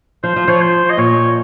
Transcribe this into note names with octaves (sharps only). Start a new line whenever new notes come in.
F3 C5
F3
F3 C#5
C5
D#5
A#2 C#5